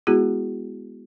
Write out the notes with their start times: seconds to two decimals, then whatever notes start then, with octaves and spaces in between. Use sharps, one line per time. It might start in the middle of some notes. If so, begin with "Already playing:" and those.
0.07 G#3 B3 E4 F#4 G#4